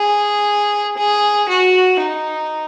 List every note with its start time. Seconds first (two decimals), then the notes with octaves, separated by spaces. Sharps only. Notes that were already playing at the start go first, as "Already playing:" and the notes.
Already playing: G#4
0.97 G#4
1.49 F#4
2.00 D#4